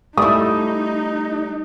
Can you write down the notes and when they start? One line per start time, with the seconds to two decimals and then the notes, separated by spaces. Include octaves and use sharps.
0.17 G3 A3 D#4 E4 D#6